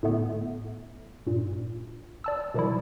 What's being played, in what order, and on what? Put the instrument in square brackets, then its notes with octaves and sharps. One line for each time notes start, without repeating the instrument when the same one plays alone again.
[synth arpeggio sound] A2 D3 A3 B3
G2 A#2
D5 A5 E6
B2 D#3 F3 G3 E4